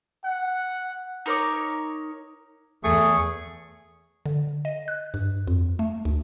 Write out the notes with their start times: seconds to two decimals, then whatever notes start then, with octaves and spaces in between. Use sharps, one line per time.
0.24 F#5
1.26 D#4 A#4 C#5 D6
2.84 E2 A3 G#4 C#6
4.26 D3
4.65 D#5
4.88 F#6
5.14 G2
5.47 F2
5.79 A3
6.05 D2